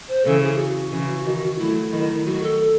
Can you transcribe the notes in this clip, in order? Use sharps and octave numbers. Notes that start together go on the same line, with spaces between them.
C5
C#3 E3 A4
G#4
F#4
C#3 E3
D#3
F#3 A3 E4
D#3 F#3
D#3 F#3 F#4
A4